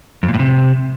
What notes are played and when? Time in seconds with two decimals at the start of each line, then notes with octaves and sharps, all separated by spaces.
0.23 F2
0.28 A#2
0.34 A2
0.39 C3